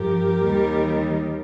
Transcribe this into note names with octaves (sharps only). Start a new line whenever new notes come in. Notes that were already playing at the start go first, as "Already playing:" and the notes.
Already playing: G2 F3 G4 A#4
D#2 D#3 G3